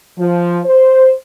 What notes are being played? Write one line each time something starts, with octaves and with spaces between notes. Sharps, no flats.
F3
C5